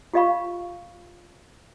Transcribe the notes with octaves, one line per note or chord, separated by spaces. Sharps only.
F4 G4 D#5 F5 B5 C#6